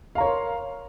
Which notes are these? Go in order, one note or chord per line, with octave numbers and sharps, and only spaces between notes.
A#4 C#5 F5 A#5 C6